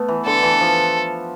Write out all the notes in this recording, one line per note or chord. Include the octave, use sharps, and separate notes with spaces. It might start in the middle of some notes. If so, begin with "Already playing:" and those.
Already playing: A3 B3
E3
D3 A4
E3
F3